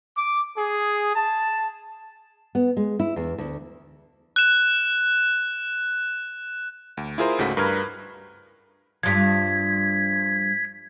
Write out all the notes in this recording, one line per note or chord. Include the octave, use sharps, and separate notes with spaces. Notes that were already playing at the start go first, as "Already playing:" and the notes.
D6
G#4
A5
B3
G#3
E4
E2
D2
F#6 E7
D2
E4 F4 G#4 A#4 C5
C#2 G#2 C#3 A3 F#4 B6
G2 A#4 B4 F6 G#6
G2 F3 G#6 B6